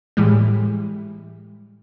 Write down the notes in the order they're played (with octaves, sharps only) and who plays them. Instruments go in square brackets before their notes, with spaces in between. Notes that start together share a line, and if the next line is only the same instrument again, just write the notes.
[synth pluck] A2 E3 G3 G#3